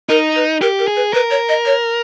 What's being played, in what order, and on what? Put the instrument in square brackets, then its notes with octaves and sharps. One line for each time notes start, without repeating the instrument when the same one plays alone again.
[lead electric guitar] D#4 [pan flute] A#4
[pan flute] B4
[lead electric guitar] G4 [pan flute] A#4
[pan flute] A#4
[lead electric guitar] G#4
[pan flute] B4
[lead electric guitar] A#4 [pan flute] B4
[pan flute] C#5
D#5
C#5